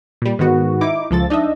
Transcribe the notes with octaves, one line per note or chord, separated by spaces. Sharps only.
A#2 G3
G#2 D#3 B3 F#4
D#4 E4 D6
C#2 F3 A4 A6
D4 D#4 D#5 E5